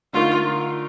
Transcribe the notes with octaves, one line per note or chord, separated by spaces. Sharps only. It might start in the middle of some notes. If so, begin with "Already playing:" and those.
D3 A3 D#4 F4 A#4